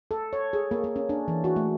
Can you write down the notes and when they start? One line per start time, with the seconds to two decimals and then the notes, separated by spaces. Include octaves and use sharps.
0.11 A4
0.33 C#5
0.53 G#4
0.71 A#3
0.84 A#3
0.96 C#4
1.09 D4
1.28 E3
1.44 F#4
1.56 A3